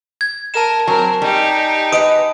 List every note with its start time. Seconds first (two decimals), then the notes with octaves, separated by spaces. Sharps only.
0.21 G#6
0.54 A#4 A5 E7
0.88 F#3 C4 A#4 G#5
1.22 G3 D#4 G4
1.92 B4 D#5 D#6 D7 D#7